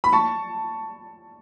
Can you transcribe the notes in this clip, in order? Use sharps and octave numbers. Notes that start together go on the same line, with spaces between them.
B5
A5 C#6